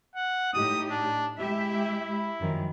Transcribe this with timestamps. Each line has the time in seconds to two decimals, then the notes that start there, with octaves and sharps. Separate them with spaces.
0.15 F#5
0.53 A2 D#4 G4 D#6
0.90 D4
1.39 G#3 E4 G4 E5
2.39 F#2 D#3 F3